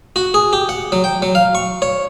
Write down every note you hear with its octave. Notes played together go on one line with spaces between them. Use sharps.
F#4
G#4
G4
F#5
F#3
G5
F#3
F5
C#6
C#5